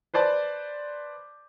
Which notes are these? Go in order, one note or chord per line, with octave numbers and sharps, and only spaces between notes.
B4 C5 D5 A5